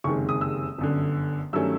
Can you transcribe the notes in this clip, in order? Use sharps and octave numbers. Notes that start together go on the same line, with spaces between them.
F#1 F2 C3 D#3 G#3 C#6
D#6
E6
G1 F#2 D3
G2 D#3 F#3 A3 C#4 E6